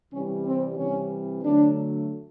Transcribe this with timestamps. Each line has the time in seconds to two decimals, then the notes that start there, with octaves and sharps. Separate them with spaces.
0.12 C3 E3 G3 C#4
0.45 C4
0.77 C3 E3 G3 C#4
1.43 D3 F#3 A3 D4